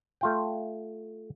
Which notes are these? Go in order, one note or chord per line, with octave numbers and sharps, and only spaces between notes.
A3 F4 G5